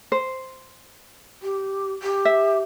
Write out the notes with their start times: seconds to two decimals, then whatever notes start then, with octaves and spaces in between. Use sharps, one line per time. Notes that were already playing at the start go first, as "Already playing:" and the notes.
0.12 C5
1.42 G4
2.02 G4
2.25 E5